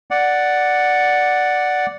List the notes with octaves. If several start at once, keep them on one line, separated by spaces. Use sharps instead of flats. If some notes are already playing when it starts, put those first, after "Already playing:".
D5 F#5